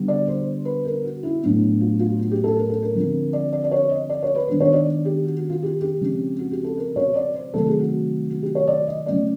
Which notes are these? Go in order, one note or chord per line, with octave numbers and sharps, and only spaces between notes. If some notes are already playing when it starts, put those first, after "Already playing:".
Already playing: D3 G3 B3
D5
C5
B4
A#4
F#4
E4
A2 F#3 B3 D4
F4
F4
F#4
G4
A4
A#4
A4
A#4
D3 F3 G#3 C4
D5
D5
D5
C#5
D#5
D5
C#5
B4
D#3 G#3 B3 D4 C5
C#5
D5
G4
F#4
F#4
F4
G4
G4
C#3 F3 G#3 C4
F#4
G4
A4
A#4
C#5
D5
C5
C3 D#3 F#3 A3 A4
G#4
F#4
F#4
G4
C#5
D5
D#5
C#3 F#3 A3 C#4 D5